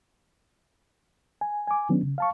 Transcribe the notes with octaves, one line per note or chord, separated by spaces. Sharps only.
G#5
G#5 D6
D#3 F#3 B3 C#4 D4
C#3
F5 A5 C#6